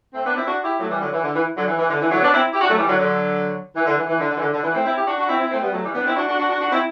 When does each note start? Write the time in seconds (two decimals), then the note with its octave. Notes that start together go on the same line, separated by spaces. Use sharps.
0.14 A3 C4
0.26 B3 D4
0.36 C4 E4
0.47 D4 F#4
0.64 E4 G4
0.80 F#3 A3
0.91 E3 G3
1.02 D3 F#3
1.13 E3
1.23 D3
1.35 E3
1.57 D3 F#3
1.67 E3
1.79 E3
1.90 D3
2.01 E3
2.11 D3 F#3
2.22 B3 D4
2.33 C4 E4
2.53 E4 G4
2.61 D4 F#4
2.69 F#3 A3
2.77 E3 G3
2.88 D3 F#3
2.99 D3 F#3
3.76 E3
3.86 D3
3.98 E3
4.09 E3
4.19 D3
4.31 D3
4.37 E3
4.41 D3
4.53 D3
4.63 E3
4.75 A3 C4
4.85 C4 E4
4.96 E4 G4
5.07 D4 F#4
5.18 D4 F#4
5.29 C4 E4
5.40 C4 E4
5.51 A3 C4
5.62 G3 B3
5.73 F#3 A3
5.84 E3 G3
5.94 B3 D4
6.06 C4 E4
6.16 D4 F#4
6.28 D4 F#4
6.39 D4 F#4
6.50 D4 F#4
6.61 D4 F#4
6.72 C4 E4